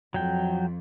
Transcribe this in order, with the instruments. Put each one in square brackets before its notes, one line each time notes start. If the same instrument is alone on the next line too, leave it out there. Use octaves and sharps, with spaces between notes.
[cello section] F2 [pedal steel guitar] F#3 G5